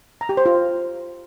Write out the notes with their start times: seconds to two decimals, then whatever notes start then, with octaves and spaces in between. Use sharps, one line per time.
0.21 A#5
0.29 G4
0.37 C5
0.46 F4